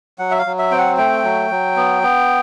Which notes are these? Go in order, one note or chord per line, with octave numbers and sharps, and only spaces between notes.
F#3 F#5
E5
F5
F#3
E5
C4 G5
F#5
A3 G5
F#3
F#3
B3
B3